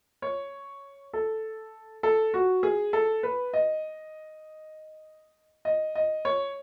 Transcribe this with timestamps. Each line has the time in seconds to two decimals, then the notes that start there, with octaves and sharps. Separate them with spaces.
0.22 C#5
1.13 A4
2.03 A4
2.34 F#4
2.63 G#4
2.93 A4
3.23 B4
3.53 D#5
5.65 D#5
5.95 D#5
6.25 C#5